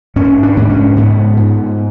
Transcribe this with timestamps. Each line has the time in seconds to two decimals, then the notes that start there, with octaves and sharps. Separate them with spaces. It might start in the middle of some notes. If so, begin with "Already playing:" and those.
0.16 G#2 C#4
0.43 D4
0.57 G#2
0.70 C#4
0.97 G#2 B3
1.37 G#2